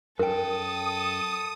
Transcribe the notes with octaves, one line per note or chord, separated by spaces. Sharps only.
F#2 A4 A#4 G5 D#6